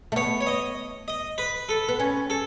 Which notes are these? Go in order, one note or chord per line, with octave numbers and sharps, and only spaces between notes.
A3
B3 C#5
C#5
D#5
D#5
B4
A4
B3
C#4
A4